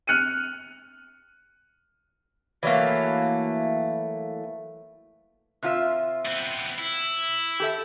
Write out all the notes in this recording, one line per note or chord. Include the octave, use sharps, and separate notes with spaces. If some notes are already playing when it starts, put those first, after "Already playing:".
F6 F#6 C#7 D#7
E3 F#3 A3 A#3
C3 F4 E5
B3 C4
E4
G4 A4 E5